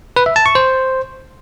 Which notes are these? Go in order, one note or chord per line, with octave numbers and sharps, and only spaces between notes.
B4
E5
A5
C#6
C5